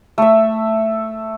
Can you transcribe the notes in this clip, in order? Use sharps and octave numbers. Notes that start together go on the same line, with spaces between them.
A3 E5